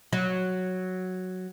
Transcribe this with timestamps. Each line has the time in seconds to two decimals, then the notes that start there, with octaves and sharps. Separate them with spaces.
0.13 F#3